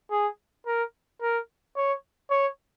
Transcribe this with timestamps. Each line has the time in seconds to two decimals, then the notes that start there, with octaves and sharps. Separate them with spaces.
0.11 G#4
0.66 A#4
1.22 A#4
1.77 C#5
2.30 C#5